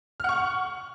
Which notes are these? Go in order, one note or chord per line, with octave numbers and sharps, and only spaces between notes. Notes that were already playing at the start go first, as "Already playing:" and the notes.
F#5 C#6 F6